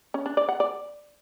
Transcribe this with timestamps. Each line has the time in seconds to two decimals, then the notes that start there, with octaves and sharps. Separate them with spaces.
0.14 C#4
0.26 D4
0.37 D5
0.49 F#5
0.60 D5